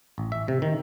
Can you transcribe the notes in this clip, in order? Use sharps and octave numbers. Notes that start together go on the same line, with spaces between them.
A1
E5
C3
D#3